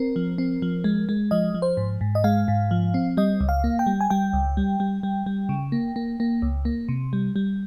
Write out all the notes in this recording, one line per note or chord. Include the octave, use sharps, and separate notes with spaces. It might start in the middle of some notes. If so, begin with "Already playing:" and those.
Already playing: C4 A#4
F3
C4
F3
G#3
G#3
F3 D#5
F3
C5
G#2
G#2
D#5
G#3 F5
G#2
F3
C4
G3 D#5
C#2
F5
A#3
G5
G3
G#5
G3 G5
C#2
G3
G3
G3
G3
C#3
A#3
A#3
A#3
C#2
A#3
C3
G3
G3